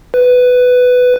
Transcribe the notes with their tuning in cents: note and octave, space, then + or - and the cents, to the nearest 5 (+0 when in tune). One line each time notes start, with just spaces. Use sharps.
B4 +10